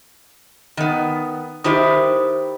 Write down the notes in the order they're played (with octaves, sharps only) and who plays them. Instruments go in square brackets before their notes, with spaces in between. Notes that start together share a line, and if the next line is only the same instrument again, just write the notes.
[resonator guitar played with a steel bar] D#3 B3
[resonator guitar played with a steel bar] D#3 E4 G4 [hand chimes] C5 D#6